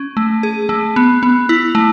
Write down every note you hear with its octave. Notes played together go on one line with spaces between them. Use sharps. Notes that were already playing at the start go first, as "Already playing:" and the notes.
Already playing: C#4
A3
G#4
A3
B3
B3
E4
A3